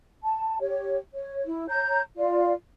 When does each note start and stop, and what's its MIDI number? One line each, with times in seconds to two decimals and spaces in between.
0.22 0.58 81
0.60 0.98 67
0.60 0.98 73
1.14 1.43 73
1.45 1.65 64
1.69 2.00 73
1.69 2.00 82
1.69 2.00 91
2.17 2.52 65
2.17 2.52 74
2.17 2.52 77